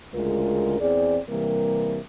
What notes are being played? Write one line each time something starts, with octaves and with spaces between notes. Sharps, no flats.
D2 C#3 G#3 F4 A#4
E2 C4 G#4 D5
C3 E3 G3 A#3 A#4